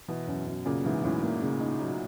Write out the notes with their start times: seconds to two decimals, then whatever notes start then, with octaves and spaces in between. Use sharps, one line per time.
0.08 B2 E3
0.27 F#2
0.46 F#2
0.65 A#2 C#3
0.85 G#2 E3
1.04 F#2 A2
1.23 A#3
1.42 C#3
1.61 D#4
1.80 F#3